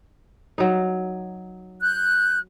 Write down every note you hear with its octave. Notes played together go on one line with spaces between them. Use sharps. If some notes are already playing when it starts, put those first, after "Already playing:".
F#3 D#4
F#6 G6